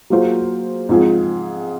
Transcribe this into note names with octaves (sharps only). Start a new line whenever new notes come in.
F#3 A#3 F4 G#4 C5
G#2 F3 C4 F4 G#4